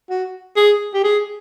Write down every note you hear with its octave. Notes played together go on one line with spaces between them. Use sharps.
F#4
G#4
G4
G#4